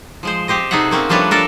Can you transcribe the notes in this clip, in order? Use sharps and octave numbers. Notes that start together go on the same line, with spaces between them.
F3 G#3 C5
C4 G4 C5 D#5
C3 D#4 G#4 A4 E5 F#5
A#3 C4 C#4
F3 G3 A3 D4 B4 C#5
D4 A4 A#4